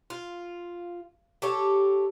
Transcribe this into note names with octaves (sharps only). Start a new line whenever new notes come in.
F4
G4 A4 C#5